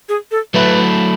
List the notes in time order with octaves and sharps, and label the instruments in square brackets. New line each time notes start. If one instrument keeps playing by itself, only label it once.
[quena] G#4
A4
[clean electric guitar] F#3 A3 E4 [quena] B4